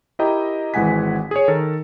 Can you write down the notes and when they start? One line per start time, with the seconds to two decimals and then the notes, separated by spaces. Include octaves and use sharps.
0.19 E4 G4 A#4 D#5 G5 A#5
0.74 G#1 E3 G#3 F#5 G#5 B6
1.31 G#4 C#5
1.48 D#3 A4 A#4